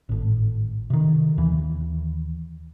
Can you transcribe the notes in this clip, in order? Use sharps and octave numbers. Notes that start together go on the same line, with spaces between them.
G#1 A2
C3 D#3
D#2 E3